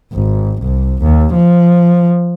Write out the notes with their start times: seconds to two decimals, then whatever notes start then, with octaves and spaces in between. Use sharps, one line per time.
0.13 G#1
0.62 C2
1.02 D#2
1.34 F3